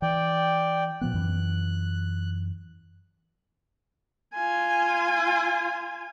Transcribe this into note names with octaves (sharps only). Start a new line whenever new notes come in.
E3 D5 G5
A#2 F3 B3 F#6
F#2 E3
F4 G#5